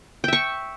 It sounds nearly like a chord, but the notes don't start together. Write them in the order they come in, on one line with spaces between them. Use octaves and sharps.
G5 E5 C#6